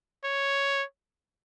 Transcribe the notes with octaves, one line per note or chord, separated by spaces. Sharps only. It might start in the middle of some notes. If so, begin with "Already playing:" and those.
C#5